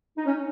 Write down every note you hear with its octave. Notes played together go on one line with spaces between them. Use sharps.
D#4
C#4